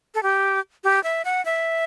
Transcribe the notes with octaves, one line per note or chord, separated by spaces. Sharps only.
A4
G4
G4
E5
F#5
E5